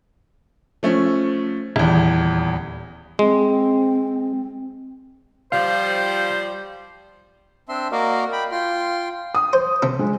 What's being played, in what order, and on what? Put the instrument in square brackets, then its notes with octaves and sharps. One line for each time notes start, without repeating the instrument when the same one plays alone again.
[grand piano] F3 A3 C#4
D#1 E2
[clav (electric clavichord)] G#3 [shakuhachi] C4
[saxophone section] F3 G3 [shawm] C5 [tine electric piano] F5
[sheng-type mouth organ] C4 D4 E5 C6
A#3 F#4 A#4 D5 D#5 F5
G5 B5
F4 G5 C6
[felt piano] D#6
[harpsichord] C5
C3 A4
[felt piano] G#3